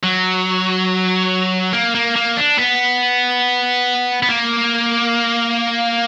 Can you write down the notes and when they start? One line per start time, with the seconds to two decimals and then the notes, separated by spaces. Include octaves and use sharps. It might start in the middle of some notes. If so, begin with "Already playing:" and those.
0.03 F#3
1.73 A#3
1.95 A#3
2.16 A#3
2.37 D4
2.59 B3
4.23 B3
4.29 A#3